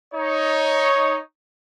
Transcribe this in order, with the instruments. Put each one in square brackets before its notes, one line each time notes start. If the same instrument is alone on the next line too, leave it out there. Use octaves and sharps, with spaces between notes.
[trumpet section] D#4 C#5